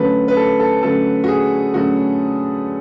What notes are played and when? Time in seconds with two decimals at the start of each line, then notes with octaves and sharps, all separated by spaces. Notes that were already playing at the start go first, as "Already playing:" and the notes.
Already playing: D3 F#3 A3 C#4 B4
0.28 B4
0.37 A4
0.60 A4
0.83 D3 F#3 A3 C#4 A4
1.24 F#4
1.28 G#4
1.74 D3 F#3 A3 C#4 F#4